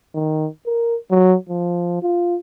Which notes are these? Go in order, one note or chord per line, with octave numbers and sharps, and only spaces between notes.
D#3
A#4
F#3
F3
F4